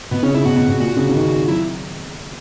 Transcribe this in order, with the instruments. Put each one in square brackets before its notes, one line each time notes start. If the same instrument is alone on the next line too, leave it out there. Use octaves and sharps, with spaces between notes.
[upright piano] B2 [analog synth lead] B3
[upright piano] C#3 [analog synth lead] C#4
[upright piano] C#3 [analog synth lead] E4
[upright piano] B2 [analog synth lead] F#4
[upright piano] B2
B2
[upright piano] A#2 [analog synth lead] F#4
[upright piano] C#3
C#3
D#3
[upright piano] F#3 [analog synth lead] E4